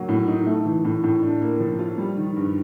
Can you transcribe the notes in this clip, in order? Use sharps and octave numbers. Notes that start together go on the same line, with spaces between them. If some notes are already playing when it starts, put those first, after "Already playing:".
Already playing: F#3 A#3
A2
D#4
A3
E3
A2
A2
D4
A#3
F3
F4
G3
D#3
G2